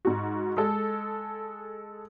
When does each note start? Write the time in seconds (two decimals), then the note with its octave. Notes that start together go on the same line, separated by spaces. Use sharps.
0.05 G#2 F#4
0.57 G#3 A4